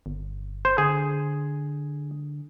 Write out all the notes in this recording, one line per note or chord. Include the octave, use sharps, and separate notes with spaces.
G1
C5
D3 G#4